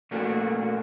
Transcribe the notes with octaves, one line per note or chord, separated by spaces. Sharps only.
A#2 A3 A#3 C#4 F#4